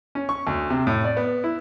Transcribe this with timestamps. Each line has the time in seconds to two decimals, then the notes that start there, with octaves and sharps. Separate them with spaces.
0.15 C#4
0.29 C#6
0.47 D2
0.70 C3
0.87 A2
1.04 D5
1.17 B3
1.44 E4